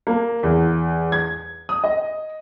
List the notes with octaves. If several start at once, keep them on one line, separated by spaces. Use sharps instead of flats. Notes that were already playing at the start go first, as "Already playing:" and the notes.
A#3
E2
G#6
D#6
D#5